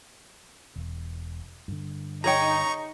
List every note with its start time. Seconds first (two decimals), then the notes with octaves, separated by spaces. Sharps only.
0.76 E1 E2
1.68 G2 D3
2.24 D#4 G#4 C#5 G5 A#5 C#6